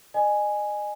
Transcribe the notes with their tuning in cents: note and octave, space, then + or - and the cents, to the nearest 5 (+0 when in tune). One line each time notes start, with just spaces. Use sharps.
D#5 -35 G#5 +0